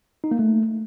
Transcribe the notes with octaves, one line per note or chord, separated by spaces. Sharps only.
D#4
A#3
A3